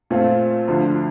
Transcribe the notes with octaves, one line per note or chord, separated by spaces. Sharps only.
A#2 A3 C4 F4
D2 D3 F3